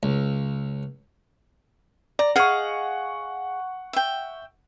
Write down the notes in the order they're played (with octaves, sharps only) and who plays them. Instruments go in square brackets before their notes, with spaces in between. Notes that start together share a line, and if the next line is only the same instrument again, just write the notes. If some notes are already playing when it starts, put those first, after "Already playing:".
[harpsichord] C#2
[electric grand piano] D5 [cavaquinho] A#5
[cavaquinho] G#4 D#5 F5 [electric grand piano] F#5 C#6
[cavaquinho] E5 G5